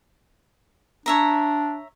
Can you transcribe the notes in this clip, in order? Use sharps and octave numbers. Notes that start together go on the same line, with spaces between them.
D4 C#5 E5 A#5